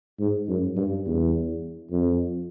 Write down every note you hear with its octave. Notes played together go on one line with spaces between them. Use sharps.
G#2
F#2
G2
E2
F2